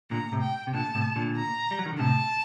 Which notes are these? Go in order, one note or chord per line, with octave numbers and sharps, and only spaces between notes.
A#2 D3 A#5
A2 C3
G5
C3
A#2 D3 A5
A2 C3
A#2 D3
A#5
G3
F#3
D#3
D3
A2 C3 A5